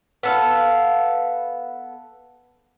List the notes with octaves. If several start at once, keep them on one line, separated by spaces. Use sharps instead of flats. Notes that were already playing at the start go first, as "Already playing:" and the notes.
B3 A4 F5